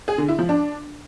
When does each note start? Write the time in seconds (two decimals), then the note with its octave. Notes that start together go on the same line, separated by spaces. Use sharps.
0.08 G#4
0.18 D3
0.28 E4
0.39 F3
0.49 D4